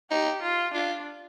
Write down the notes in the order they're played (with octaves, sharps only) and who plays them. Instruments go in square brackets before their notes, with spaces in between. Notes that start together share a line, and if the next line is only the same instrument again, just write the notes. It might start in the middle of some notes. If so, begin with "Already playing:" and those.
[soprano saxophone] D#4 [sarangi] G4
[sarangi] F4
[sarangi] D4 [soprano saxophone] F4